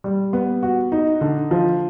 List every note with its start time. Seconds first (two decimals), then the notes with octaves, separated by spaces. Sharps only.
0.04 G3
0.33 B3
0.63 F#4
0.92 D#4
1.21 D3
1.51 F3